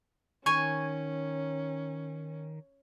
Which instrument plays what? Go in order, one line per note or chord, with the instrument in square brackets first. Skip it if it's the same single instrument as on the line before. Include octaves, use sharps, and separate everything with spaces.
[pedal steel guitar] D#3 [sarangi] C#4 [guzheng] C#5 G#5 [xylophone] C#6